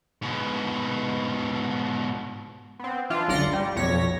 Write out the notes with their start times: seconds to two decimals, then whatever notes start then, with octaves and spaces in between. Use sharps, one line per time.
0.22 G#2 B2
2.79 B3 C4
3.10 E3 D4 F4
3.28 G1 C#2 D5 C6 A#6 C#7
3.53 G3
3.75 B1 F2 C#5 A#6 B6